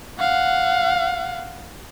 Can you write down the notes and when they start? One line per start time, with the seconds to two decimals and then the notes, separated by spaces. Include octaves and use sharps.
0.19 F5 F#5